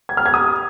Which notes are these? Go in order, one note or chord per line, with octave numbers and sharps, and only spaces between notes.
G#6
F6
G#6
D#6